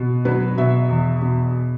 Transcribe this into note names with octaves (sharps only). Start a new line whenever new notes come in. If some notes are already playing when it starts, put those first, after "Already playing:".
Already playing: B2
F#3 B4
B2 E5
E2
B2